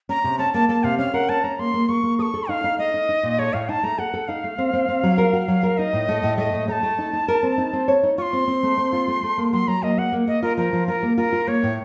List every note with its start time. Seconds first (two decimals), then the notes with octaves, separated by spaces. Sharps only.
0.09 C#4 A#5
0.24 C3
0.39 C#4 A5
0.54 A#3 A5
0.69 A#3 A5
0.84 C3 F5
0.98 C#4 F5
1.14 A#4 F#5
1.29 C#4 A5
1.44 C#4 A#5
1.59 A#3 C6
1.74 A#3
1.89 A#3 C#6
2.03 A#3
2.19 A4 C#6 D#6
2.34 A4
2.49 D#4 F5
2.64 D#4
2.79 A3 D#5
2.94 D#4
3.09 D#4
3.23 A#2
3.39 A4 C#5
3.53 A2 F5
3.69 D#4 A5
3.83 A3 A#5
3.98 A4 F#5
4.14 A4
4.28 D#4 F5
4.44 A3
4.58 C4
4.73 C4
4.89 C4
5.03 F#3
5.18 A#4
5.33 F#4
5.48 F#3
5.63 A#4
5.78 D#4 D#5
5.93 A2
6.09 A3
6.23 A2
6.38 A3 D#5
6.53 A2
6.68 A3 A#5
6.72 A5
6.83 A3
6.99 D#4
7.13 D#4
7.28 A#4
7.43 C4
7.58 D#4
7.73 C4
7.88 C#5
8.03 D#4
8.18 F4 C6 C#6
8.33 C4
8.48 C4
8.63 A3
8.78 C4
8.93 F4
9.08 A3
9.23 A3
9.38 A#3
9.53 F#3 C6
9.68 F#3 A#5
9.83 A#3 D#5
9.98 A#3 F#5
10.12 A#3
10.28 A#3 D#5
10.42 F4 A#4
10.57 F3 A#4
10.73 F3
10.88 F4 A#4
11.03 A#3
11.17 F4 A#4
11.32 F4
11.47 A#3 C#5
11.63 A2